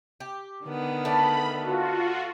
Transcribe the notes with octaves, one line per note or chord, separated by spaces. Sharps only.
G4
D3 D#3 B3
A3 D5 B5
F4 F#4